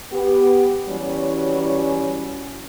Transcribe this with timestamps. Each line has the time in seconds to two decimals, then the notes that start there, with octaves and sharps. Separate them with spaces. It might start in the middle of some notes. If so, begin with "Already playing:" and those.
0.11 B3 G4
0.87 E3 F#3 G3 C#4